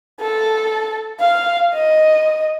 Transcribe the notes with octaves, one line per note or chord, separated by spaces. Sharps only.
A4
F5
D#5